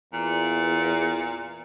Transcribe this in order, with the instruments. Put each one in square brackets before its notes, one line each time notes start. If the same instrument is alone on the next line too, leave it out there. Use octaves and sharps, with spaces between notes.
[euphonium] E2 [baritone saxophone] A#2